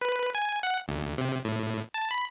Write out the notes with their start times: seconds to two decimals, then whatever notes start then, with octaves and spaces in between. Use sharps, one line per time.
0.01 B4
0.35 G#5
0.63 F#5
0.88 D2
1.18 C3
1.45 A2
1.94 A5
2.11 B5